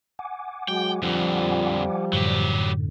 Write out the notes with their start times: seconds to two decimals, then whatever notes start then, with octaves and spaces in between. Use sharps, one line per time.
0.19 F#5 G#5 D6
0.68 F#3 G#3 F#4 G5
1.03 F2 D3 F3 G3
2.13 F#2 A2 D3 F#3 G4